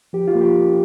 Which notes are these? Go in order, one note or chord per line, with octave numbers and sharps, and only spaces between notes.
F3 G4
F4
A#3
G4
C#4